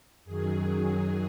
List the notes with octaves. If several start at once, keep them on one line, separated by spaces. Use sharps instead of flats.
F#2 D#3 F#3 G#4